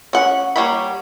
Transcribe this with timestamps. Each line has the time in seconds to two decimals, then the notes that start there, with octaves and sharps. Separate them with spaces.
0.13 C#4 F#5
0.56 G3 A#3 C#5 F#5 B5